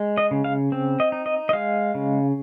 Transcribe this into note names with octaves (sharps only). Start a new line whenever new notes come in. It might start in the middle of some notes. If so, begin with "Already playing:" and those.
Already playing: G#3
D#5
C#3
F5
C4
D#5
D#4
D#5
D#5
G#3 F5
C#3